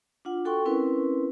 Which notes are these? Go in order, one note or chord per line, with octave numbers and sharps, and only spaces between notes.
D4 F4 F#5
F#4 A4 G5 C6 C#6
C4 C#4 E4 A#4 B4 C6